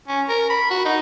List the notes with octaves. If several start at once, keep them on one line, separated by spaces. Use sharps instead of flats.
C#4
A#4
B5
F#4
D#4